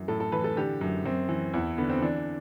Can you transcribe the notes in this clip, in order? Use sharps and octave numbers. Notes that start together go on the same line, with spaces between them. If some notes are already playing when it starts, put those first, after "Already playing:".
Already playing: F#2 E3
A2 A4
A4
E3 B4
A4
D3 G4
F#2
F#2 C4
E3
E2 E4
D3 B3
C4
E3 D4